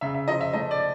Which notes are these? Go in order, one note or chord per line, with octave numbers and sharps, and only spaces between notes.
C#3 E5
E5
F3 D#5
E5
A3 D#5
D5